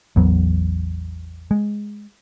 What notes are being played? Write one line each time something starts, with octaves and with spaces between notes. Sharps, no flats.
A1 E2 F#3 B3
G#3